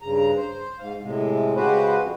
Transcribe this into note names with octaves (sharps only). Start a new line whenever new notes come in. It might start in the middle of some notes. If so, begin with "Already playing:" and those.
G2 C#3 A#5
C5
G#2 F5
A2 C3 G#3
C#3 G#3 F#4 G4 B4 C5
F2